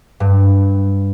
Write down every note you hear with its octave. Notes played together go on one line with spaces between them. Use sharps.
G2